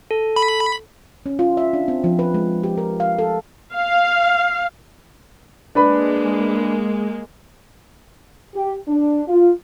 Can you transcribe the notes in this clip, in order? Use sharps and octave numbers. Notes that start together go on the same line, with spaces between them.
A4
B5
C#4
F4
E5
D4
C4
F3
B4
G#3
G4
A#4
F5
A4
F5
G#3 A#3 D4 B4 B5
G4
D4
F4